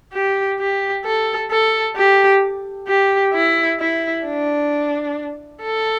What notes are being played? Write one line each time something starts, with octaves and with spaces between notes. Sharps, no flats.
G4
G4
A4
A4
G4
G4
E4
E4
D4
A4